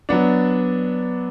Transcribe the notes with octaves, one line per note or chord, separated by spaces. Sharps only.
F#3 B3 D4